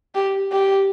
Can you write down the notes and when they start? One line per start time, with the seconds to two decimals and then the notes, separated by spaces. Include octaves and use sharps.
0.15 G4
0.52 G4